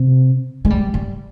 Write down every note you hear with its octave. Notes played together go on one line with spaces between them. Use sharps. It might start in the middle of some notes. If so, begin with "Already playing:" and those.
Already playing: C3
G#3
G3
G3